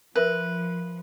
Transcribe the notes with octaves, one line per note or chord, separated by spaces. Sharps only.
F3 A#4 B4 E5 E6